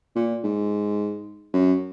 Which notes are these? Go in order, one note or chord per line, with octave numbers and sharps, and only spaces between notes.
A#2
G#2
F#2